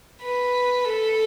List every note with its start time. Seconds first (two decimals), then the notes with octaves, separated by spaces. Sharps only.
0.23 B4
0.85 A4